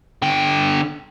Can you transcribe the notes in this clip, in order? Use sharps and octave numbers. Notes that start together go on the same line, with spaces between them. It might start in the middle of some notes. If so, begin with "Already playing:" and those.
D3 G5